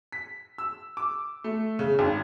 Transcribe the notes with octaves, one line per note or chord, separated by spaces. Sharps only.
B6
E6
D6
A3
C#3
G#1